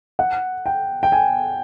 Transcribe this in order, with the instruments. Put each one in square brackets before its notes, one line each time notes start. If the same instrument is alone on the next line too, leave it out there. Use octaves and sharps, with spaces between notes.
[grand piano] F#5
G5
G5
G#5